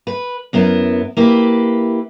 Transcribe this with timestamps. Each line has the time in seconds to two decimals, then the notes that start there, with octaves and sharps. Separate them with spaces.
0.07 B4
0.53 F#2 B3 E4 A#4
1.17 A#3 E4 G4 B4